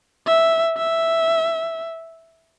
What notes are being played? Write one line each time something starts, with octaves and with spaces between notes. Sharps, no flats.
E5
E5